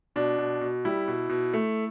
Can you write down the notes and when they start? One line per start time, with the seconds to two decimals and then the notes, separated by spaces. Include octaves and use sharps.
0.16 B2 D4
0.38 B2
0.61 B2
0.85 G3 E4
1.08 B2
1.29 B2
1.53 A3